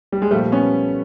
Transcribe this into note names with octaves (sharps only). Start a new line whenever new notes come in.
G3
G#3
A#2 F3 G3 A3
B3 C#4